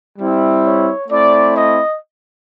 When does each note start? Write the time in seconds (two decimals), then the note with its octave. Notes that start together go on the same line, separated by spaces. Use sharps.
0.19 G3 C4 E4
0.64 C#5
1.09 A3 C4 E4 D5
1.54 D#5